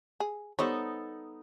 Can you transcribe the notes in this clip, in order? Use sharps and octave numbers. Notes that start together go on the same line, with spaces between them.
G#4
G3 B3 D#4 A4 C5 C#5